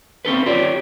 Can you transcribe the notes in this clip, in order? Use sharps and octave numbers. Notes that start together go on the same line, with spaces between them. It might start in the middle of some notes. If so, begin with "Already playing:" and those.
C4 C#4 A4 B4
F4 G4 C#5 D5